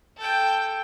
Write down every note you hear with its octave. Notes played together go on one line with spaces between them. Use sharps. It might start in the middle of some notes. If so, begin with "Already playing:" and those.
A4 G5